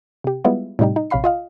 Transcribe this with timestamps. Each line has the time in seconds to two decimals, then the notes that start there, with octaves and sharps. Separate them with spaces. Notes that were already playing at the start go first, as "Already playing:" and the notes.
0.24 C3 G4
0.44 G3 G#3 B3 E4 F4
0.79 A2 C3 G3 D#4 G4
0.96 D#4
1.10 A#1 C3 C#5 F5 B5 C7
1.24 F4 D#5 F5